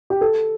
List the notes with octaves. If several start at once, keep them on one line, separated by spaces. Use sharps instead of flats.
G4
A4